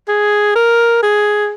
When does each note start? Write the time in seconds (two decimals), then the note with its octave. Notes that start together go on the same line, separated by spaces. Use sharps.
0.08 G#4
0.56 A#4
1.03 G#4